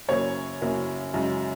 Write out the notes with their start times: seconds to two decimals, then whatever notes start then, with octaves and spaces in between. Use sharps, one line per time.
0.08 F#2 C#3 A#3 C#5
0.62 F#2 C#3 A#3
1.14 F#2 C#3 G#3